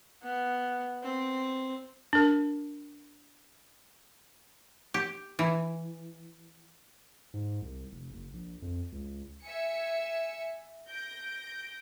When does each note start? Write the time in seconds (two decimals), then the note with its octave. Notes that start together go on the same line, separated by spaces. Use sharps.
0.23 B3
1.03 C4
2.13 D4 A#4
4.94 G4
5.39 E3
7.34 G#2
7.62 C2
7.92 F1
8.11 F#1
8.33 A#1
8.62 F2
8.92 C#2
9.44 E5 G#5 C#7
10.88 G6 A#6 D7